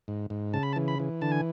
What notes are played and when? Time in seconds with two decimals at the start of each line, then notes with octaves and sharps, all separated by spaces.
0.08 G#2
0.30 G#2
0.54 C#3 A5
0.63 B5
0.73 A5
0.76 E3
0.88 B5
1.00 E3
1.21 D3 A5
1.32 G#5